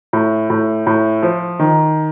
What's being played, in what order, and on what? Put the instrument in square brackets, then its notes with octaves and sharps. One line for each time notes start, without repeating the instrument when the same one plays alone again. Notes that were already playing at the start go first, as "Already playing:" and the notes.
[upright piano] A2
A2
A2
F3
D#3